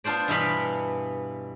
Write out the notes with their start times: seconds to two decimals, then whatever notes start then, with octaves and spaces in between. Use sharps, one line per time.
0.04 B3 D4 F4 C5 D5
0.28 G2 B2 E3 B3 F5 B5